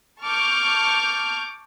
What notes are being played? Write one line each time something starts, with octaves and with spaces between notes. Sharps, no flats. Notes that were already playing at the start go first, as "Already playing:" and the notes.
A5 C#6 D6 F6 G6